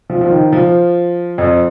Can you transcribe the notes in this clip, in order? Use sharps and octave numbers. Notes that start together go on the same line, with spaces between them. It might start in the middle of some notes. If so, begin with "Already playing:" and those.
F3
F3
D#3
F3
F2